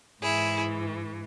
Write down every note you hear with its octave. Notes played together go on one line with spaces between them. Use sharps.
G#2 E3 E4 G#4